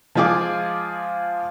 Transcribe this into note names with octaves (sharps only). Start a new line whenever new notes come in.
F3 G#3 F4 G#4 G#5 D6